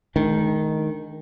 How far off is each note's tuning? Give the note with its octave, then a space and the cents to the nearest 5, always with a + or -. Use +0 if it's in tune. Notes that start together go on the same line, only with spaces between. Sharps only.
D#3 +0 G#3 +45 D4 +0